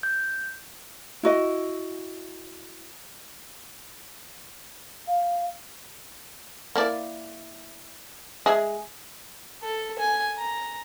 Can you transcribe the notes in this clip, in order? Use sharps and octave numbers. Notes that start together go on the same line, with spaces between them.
G6
E4 F#4 D#5
F5
A#3 E4 D5
G#3 G#4 E5
A4
G#5
A#5